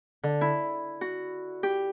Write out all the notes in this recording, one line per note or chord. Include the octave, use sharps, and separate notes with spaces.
D3
E4
F#4
G4